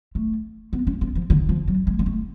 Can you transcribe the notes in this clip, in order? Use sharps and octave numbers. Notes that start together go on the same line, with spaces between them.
A3
B3
C#4
B3
F3
D3
F3
F#3
G#3
G#3
A3